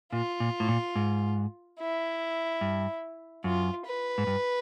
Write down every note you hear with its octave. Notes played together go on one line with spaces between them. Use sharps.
A#2 F4
A#2
A2
A#2
G#2
E4
G2
F#2 F4
B4
G#2
G2